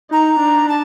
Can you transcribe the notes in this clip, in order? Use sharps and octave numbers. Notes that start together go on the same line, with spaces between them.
D#4 A#5
D4
A5